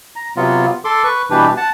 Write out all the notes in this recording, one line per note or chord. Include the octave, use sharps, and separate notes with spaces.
A#5
C3 F#3 B3 F4
A4 C6 D6
B4 C#6
B2 E3 G3 D4 G4 B4
F#5 A5